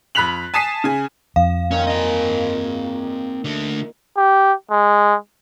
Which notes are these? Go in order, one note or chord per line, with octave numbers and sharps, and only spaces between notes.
F2 B5 F#6 B6 F7 F#7
G#5 A5 D#6 B6 C7 D#7
C#3 G#5
F2 F5
A#2 D#3 C#4
C4 D#5 G#5
D3 A3
G4
G#3